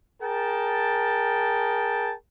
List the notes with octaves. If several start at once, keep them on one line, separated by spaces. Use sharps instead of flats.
G#4 A#4 G5 A5